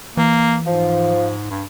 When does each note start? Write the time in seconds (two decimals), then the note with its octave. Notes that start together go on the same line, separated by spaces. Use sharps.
0.17 E3 A#3
0.66 G#2 F3
1.50 G2